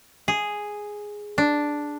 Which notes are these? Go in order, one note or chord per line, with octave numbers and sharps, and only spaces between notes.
G#4
D4